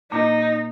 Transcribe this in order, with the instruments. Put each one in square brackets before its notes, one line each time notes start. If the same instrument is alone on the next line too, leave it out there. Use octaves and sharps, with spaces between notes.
[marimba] A#2 A#3 [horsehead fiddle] D#4